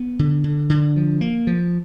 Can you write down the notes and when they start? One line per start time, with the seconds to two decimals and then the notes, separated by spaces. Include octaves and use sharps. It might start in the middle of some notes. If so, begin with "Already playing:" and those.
Already playing: B3
0.19 D3
0.44 D3
0.69 D3
0.96 F3
1.21 A#3
1.47 F3